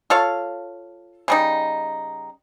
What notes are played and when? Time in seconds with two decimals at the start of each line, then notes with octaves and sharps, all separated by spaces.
0.10 F4 A4 C#5 F5
1.28 C#3 G3 D#4